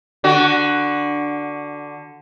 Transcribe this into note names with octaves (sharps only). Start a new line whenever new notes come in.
D3 F#4